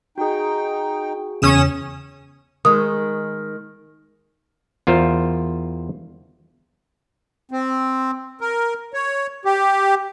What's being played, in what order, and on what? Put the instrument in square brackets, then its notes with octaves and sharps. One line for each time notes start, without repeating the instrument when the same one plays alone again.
[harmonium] D#4 G5 [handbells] F#4 G#4
[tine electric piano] E2 C#3 [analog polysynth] C#4 D#6 E7
[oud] D#3 G#3 [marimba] D#6
[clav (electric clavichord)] E2 F4 A#4 C5
[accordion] C4
A#4
C#5
G4